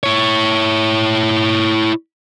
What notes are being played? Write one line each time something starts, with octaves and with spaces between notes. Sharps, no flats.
E4 C#5